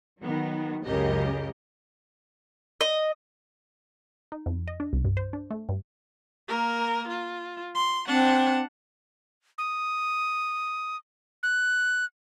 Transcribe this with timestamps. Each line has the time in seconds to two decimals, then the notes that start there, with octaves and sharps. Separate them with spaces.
0.22 D#3 F#3 B3
0.86 C#2 F#2 C#3 G4 A#4 D#5
2.81 D#5
4.32 D#4
4.46 F2
4.68 D#5
4.80 D4
4.93 C2
5.04 G2
5.17 C5
5.33 D4
5.51 A3
5.69 G2
6.48 A#3 A#4
7.08 F4
7.75 C6
8.07 C4 D4 F#5
9.58 D#6
11.43 F#6